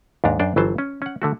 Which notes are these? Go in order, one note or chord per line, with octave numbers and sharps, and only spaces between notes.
D#2 G#2 D4 A#5
F#2 D4 C5 D5
G1 E3 F#3 C5 A5
C#4
C#4 F#5
D3 A3 F#4